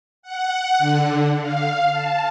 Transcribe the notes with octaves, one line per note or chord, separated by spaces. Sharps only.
F#5
D3
F5
A5